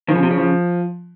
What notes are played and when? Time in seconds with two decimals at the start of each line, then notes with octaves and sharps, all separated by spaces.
0.08 D#3 F3
0.15 C#3
0.23 C3
0.31 C#3
0.38 F3